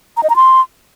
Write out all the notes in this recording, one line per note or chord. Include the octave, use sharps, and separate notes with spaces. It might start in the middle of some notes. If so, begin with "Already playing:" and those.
A#5
D#5
A#5
C6